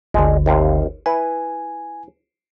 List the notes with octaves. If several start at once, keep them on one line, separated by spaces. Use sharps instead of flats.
G1 D2 D3 G#3 D4
D#2 C3 F5
E4 B4 G#5